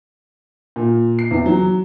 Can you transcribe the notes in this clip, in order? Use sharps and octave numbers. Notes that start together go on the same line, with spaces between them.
A#2
C7
E2
F#3